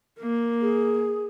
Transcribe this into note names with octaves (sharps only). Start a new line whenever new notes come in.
A#3
G#4